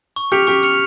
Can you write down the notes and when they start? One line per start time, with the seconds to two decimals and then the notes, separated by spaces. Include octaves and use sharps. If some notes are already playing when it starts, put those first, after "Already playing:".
0.16 C#6
0.32 G4 F6 C#7 F7
0.47 G4 C#6
0.63 F6 C#7 F7